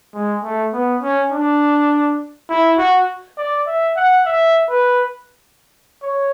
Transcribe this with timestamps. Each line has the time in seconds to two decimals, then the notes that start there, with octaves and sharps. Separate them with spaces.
0.14 G#3
0.43 A3
0.73 B3
1.02 C#4
1.32 D4
2.50 E4
2.78 F#4
3.38 D5
3.67 E5
3.96 F#5
4.26 E5
4.69 B4
6.03 C#5